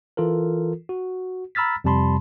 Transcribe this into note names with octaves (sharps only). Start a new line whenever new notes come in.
E3 F4 A4 A#4
F#4
A#5 B5 E6 F6 A6 B6
F2 C3 G3 A5 B5 C6